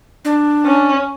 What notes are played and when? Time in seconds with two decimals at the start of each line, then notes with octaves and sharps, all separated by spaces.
0.25 D4
0.66 C#4